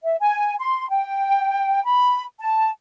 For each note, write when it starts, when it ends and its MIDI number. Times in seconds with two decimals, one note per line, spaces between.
0.03 0.16 76
0.20 0.55 80
0.59 0.90 84
0.90 1.82 79
1.84 2.23 83
2.40 2.70 81